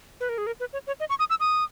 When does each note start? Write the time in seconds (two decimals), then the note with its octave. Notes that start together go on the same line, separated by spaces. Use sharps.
0.21 B4
0.29 A#4
0.38 G#4
0.47 A#4
0.60 B4
0.73 C#5
0.87 C#5
1.00 D#5
1.10 C#6
1.19 D#6
1.30 E6
1.40 D#6